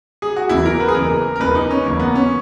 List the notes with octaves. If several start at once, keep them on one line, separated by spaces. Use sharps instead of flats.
G#4
F#4
F#1 E2 C#3 E3 E4
A#4
B4
G#4
F#1 E2 C#3 E3 A#4
A#4
F#1 E2 C#3 E3 B4
D#4
C#4
F#1 E2 C#3 E3 A#3
B3
C#4